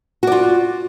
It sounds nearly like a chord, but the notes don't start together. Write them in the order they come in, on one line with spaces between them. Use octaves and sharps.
F#4 D5 F4